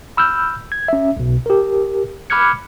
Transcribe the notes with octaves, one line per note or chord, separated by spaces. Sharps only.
B5 E6 F6 G6
G#6
C#4 E5
B1 B2
G4 A#4
B5 D6 F6 F#6 G#6 C#7